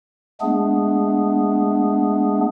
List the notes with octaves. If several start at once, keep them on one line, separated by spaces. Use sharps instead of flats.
G#3 A3 B3 D4 G#4